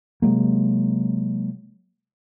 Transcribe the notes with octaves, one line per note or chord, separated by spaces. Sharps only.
C3 F#3 G#3 A#3